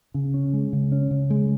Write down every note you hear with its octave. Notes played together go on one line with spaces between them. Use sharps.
C#3
C#4
G#3
C#3
C#4
C#3
G#3